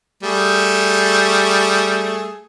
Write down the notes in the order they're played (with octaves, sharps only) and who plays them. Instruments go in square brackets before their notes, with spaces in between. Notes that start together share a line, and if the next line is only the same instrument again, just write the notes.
[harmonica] G3 A3 G#4